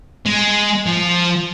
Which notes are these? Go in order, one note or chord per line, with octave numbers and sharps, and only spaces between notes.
G#3
F3